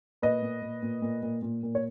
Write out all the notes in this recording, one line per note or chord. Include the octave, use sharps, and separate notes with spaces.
A#2 B4 D#5
A#2
A#2
A#2
A#2
A#2
A#2
A#2
C#5